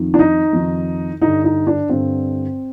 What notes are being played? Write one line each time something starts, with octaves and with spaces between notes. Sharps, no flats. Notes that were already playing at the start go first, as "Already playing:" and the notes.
Already playing: F2 D#3
D4
D#4
F2 D#3
G2 D3 D#4
D#4
D4
G2 D3 C4